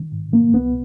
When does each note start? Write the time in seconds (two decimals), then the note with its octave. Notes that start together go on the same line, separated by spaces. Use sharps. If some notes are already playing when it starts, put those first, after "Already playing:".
Already playing: D#3
0.12 G#2
0.33 F3 A#3
0.53 C2 B3